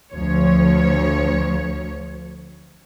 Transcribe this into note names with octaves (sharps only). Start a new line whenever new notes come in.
D2 F3 C#5